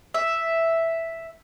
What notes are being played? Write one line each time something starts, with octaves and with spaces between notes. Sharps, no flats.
E5